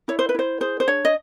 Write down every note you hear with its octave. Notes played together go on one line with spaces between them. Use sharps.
E4 C#5
C5
B4
E4 C5
G#4 C5
C5
D4 C#5
D#5